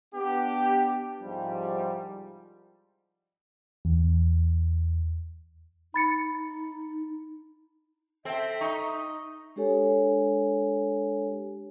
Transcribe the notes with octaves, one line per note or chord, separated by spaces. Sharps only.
B3 D4 G4
C2 G#2 F3 G3
E2
D#4 B5 A6 C#7
C4 A4 E5 G5
D#4 C#6
G#3 D4 G4 A4 C#5 G#5